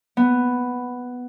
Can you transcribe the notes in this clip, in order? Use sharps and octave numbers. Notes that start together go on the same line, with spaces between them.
B3